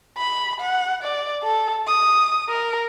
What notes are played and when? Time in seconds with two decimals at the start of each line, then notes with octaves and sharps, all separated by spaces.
0.18 B5
0.61 F#5
1.03 D5
1.44 A4
1.87 D#6
2.49 A#4